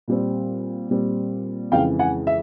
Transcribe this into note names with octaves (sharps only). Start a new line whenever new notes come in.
A#2 G3 C4
A#2 G3 C4
F2 C#3 E3 G#3 F5 G5
F#5 G#5
E5